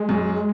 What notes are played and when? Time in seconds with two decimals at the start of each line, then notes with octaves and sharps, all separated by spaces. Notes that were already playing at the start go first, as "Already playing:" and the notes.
Already playing: G#3
0.09 F#2